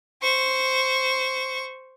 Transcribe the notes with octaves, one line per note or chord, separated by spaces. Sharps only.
C5 C#6